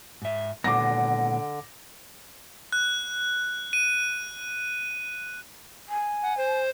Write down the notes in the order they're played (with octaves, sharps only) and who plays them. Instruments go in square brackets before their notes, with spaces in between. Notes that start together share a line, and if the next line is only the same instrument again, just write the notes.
[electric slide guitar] G#2 E5
[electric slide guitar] A#2 G#3 B3 [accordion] D3 [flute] F#5 [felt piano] D6 A#6
[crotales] F#6
D#7
[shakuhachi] G#5
[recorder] F#5
C5